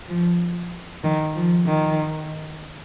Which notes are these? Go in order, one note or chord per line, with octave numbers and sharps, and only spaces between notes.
F3
D#3
F3
D#3